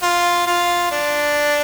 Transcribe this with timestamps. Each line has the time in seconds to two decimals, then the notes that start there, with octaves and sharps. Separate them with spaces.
0.02 F4
0.47 F4
0.91 D4